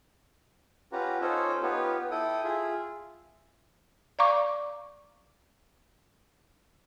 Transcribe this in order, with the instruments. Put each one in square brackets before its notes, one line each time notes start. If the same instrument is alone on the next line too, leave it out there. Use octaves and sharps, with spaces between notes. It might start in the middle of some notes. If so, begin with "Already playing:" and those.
[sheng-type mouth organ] C#4 F4 G4 B4 F#5 A#5
C#4 D#4 F4 A4 C5 C#5
B3 D#4 F4 G4 B4 C#5
E4 A4 G5 D#6
F4 G#4 E5
[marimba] D5 F5 A#5 C#6 D6